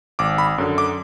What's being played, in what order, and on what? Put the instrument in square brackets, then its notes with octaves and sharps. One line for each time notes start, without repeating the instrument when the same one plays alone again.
[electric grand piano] G#1 D6
B5
F#2 D3
D6